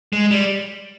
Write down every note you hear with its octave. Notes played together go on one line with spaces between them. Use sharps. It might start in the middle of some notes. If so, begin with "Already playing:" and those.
G#3
G3